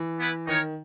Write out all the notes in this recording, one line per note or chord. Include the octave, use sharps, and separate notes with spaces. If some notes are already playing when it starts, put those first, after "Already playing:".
Already playing: E3
B3 E4 B4
D#3 D#4 A#4 C#5